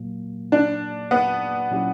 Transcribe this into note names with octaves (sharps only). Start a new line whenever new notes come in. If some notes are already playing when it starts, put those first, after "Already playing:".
Already playing: A#2 F#3 A#3
D4
B3
A#2 F#3 C#4 E4 G4